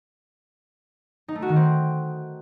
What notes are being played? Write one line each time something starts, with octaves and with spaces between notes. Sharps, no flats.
D#4
A3
F#4
D#3
C4